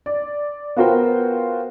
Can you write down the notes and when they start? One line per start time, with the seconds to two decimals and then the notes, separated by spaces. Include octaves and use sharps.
0.06 D5
0.76 B3 F4 F#4 A#4 C5 G5